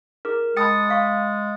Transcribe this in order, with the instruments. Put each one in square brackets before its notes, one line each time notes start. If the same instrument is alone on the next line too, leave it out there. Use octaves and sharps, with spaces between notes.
[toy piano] E4 G#4 [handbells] A#4
[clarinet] G#3 [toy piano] G5 A5 B5 [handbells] D#6 A6 C#7
[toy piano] E5 F5 C#6